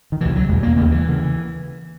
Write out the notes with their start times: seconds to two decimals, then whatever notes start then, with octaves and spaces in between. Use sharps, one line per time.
0.12 D#3
0.21 C#2 B2 E3
0.36 F#3
0.49 E2 B2 G#3
0.63 A#3
0.77 D#2 C#3 A#3
0.91 E3
1.09 C#3